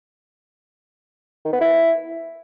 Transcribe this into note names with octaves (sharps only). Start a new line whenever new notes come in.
D#3
B3
E4